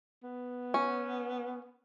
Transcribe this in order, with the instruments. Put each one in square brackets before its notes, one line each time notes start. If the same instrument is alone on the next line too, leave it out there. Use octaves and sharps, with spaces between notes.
[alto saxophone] B3
[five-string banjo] C#4